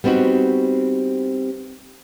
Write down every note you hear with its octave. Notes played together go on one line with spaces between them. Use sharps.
G3 B3 C4 D#4 F#4